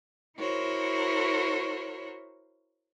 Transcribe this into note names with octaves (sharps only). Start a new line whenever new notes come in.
E4 F#4 A#4 C5 C#5